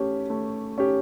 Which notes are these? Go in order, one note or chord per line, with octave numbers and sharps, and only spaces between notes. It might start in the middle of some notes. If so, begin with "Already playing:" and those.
Already playing: A3 C#4 G4
A3
C#4 G4